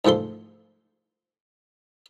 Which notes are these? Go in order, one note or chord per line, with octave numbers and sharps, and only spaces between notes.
D2 G#2 F3 A4 C6